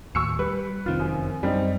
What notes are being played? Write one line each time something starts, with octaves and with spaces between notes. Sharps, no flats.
D#2 A2 C#6 E6 C#7
G3 B4
F1 D#3 C4 F4
F#2
F#2 G3 C4 D#4